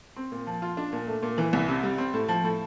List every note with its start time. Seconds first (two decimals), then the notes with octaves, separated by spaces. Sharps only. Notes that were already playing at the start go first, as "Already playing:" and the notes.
0.16 C4
0.32 A#2
0.47 F3
0.62 F4
0.77 D4
0.93 A#2
1.07 A3
1.23 A#2
1.38 E3
1.53 C2
1.68 C3
1.83 G3
1.98 C4
2.14 A2
2.28 F3
2.44 A2